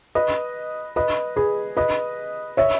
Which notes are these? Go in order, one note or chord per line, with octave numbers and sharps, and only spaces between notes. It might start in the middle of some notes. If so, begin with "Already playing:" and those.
B4 D#5
B4 D#5
G#4 B4
B4 D#5
C#5 E5